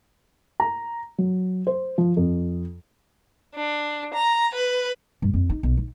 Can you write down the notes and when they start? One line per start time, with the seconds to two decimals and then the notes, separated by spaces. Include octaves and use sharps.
0.60 A#5
1.18 F#3
1.67 C5
1.98 F3
2.17 F2
3.55 D4
4.14 A#5
4.55 B4
5.22 G2
5.34 F2
5.50 D#4
5.63 B1
5.77 D#4